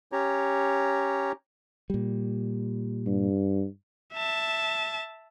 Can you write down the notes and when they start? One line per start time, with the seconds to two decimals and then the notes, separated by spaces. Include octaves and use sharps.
0.12 C#4 G4 C#5 A#5
1.90 A#2 G3
3.06 G2
4.13 E5 A5